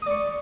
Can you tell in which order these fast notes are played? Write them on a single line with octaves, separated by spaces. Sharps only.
D#6 D5 C#6